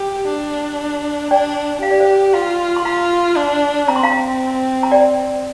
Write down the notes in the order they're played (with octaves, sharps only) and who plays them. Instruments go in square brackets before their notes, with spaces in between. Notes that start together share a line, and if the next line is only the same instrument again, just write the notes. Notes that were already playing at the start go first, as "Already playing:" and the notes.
Already playing: [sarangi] G4
D4
[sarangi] D4 [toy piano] D5 G5
[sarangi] G4 [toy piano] F5
[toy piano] D5
C5 F5
[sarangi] F4 [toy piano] F5 A#5
[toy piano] C6
[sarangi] F4 [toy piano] F5 A#5
[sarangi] D4
[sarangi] C4 [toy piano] A#5
[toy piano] C6
F5 A#5
A#5
D5 G5